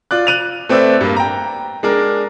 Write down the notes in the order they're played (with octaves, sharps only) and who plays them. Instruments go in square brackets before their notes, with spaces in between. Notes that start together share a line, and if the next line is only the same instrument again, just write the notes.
[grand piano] F4 D5 F#6
F#6 D#7 F7
A3 C4 B4 D5 E5
G2 A#3
G5 A#5
G#3 D4 A#4